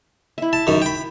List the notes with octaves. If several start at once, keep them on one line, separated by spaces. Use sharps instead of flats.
E4 E5
A5
F#2 D#3
G5 B5